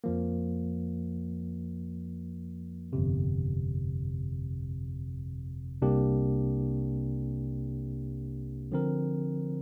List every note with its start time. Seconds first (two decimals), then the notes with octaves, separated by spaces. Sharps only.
0.04 F2 F3 A#3
2.93 G1 F2 C3
5.82 C2 C3 A#3 D4 G4
8.72 D3 F3 C4 A#4